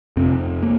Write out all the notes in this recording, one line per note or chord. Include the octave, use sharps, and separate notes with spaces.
F2 C3 C4
A#3